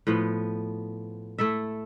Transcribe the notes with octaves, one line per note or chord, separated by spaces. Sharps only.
A2 F3 B3
A3 E4 A4 E5